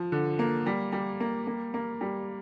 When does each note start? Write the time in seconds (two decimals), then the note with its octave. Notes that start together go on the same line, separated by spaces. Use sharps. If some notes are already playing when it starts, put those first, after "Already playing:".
Already playing: F3
0.12 D3
0.39 A#3
0.66 G3
0.92 G3
1.20 A#3
1.47 A#3
1.74 A#3
2.01 G3